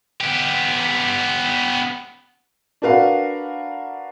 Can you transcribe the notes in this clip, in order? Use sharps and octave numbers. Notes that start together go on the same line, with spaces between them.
B3 G4
D4 F#4 A#4 B4 F5 F#5